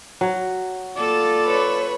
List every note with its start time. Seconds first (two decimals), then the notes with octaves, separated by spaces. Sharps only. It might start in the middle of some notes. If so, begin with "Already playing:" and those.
0.21 F#3
0.96 A#3 F4 A4 D5
1.44 B4 C#5